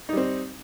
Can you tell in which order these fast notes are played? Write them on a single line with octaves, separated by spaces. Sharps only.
D#4 G3 C4